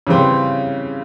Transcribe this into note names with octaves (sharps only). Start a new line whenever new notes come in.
C#3 E3 G3 C4